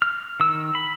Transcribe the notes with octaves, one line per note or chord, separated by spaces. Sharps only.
F6
D#3 E6
B5